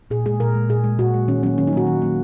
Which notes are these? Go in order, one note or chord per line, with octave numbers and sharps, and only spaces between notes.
A#2 G#4
G#3 G#4
A#2 A#4
G#3
A#2 G#4
G#3
A#2 F#4
G#3
D#3 C#4
F#3 A#3 C#4
D#3 C#4
D#4
F#3 A#3 F#4
D#3
F#3 A#3